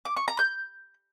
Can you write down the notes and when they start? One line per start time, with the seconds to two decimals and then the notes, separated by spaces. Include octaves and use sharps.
0.05 D6
0.17 C#6
0.28 A#5
0.39 G6